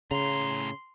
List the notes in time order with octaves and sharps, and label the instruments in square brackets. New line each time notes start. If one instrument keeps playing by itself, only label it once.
[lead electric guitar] A2 A#5 [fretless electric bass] C#3 [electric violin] C6